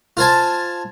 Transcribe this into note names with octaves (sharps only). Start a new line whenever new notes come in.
F4 C5 G#5 A5